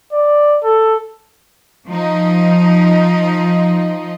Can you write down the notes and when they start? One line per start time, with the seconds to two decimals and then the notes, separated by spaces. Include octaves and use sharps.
0.13 D5
0.64 A4
1.87 F3 D#4